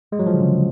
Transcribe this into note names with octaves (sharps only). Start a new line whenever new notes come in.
G#3
F#3
F3
D3
C#3